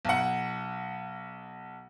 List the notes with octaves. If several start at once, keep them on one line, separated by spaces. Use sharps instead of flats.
B1 F#5